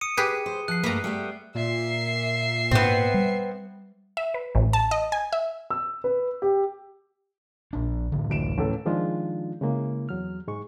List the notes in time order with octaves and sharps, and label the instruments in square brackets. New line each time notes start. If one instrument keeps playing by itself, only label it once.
[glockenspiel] D#6 C#7 D#7
[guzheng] G4 G#4 B4
[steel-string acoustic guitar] C5
[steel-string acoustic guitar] F3 [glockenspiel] F#6 C7
[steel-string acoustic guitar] G2 A3 A#3 [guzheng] B4 A#5
[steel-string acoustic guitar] G3 A3 B3
[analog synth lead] A#2 [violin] E5 C7
[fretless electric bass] G#2 B2 [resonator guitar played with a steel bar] B3 C4
[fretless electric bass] G3
[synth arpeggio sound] E5
B4
A1
A5
D#5
G#5
E5
[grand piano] E6
B4
G4
[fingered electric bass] A#1 D4
A1 D3
[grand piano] D1 D7 E7
A1 A4
[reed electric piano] D#3 F3 G#3 D4 D#4 F4
C#3 G#3 A#3 E4
E2 F#3 F6
G#2 G#3 C#6